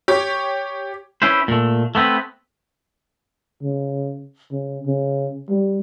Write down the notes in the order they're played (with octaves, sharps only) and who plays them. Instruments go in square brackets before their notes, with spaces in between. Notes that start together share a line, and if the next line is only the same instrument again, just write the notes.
[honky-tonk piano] G4 C#5
[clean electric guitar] C#4 E4 B4 C5
A#2 A3
A3 B3 C4 B4
[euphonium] C#3
C#3
C#3
G3